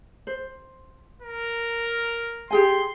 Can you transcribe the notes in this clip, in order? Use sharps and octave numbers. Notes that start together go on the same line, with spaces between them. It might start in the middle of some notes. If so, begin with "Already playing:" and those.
C5
A#4
G4 G#4 G#5 C6